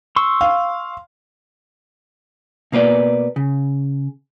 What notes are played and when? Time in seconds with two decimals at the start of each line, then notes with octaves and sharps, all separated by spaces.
0.16 C6 C#6 E6
0.41 F5
2.72 B2 A#3 B4 D5
3.36 C#3